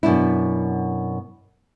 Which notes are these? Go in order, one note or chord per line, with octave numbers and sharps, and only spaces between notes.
F#2 B2 D4 E4